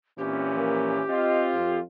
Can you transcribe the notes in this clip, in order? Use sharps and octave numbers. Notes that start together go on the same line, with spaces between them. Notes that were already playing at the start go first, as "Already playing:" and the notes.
A#2 E3 C4 C#4 G4
F3 A#3 A#4
C4 F4 D#5
F2